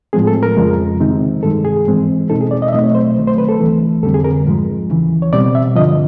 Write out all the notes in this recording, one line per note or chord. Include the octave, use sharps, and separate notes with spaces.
A2 F3 G#3 C4 G#4
A4
A#4
F2 C#3 F3 G#3
C3 D#3 G#3 C4 D#4
G2 D#3 G#3 A4
G#4
G#2 E3 G#3 C4
E2 B2 G#3 C4 D#4 A4
G#4
D5
D#5
E5
B2 F#3 A3 C4 D#5
C#5
C5
C2 C3 D#3 F#3 A3
C5
B4
A4
C#2 C3 E3 A3
F2 D3 G3 C4 A4
G#4
A#4
G#2 F3 G#3
D#2 C#3 E3
C#5
B2 G3 C4 D5
E5
G2 D3 F3 D#5